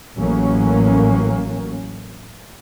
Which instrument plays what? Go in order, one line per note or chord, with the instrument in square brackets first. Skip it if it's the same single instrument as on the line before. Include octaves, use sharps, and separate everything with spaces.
[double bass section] A1 A2 F#3 A#3 C#4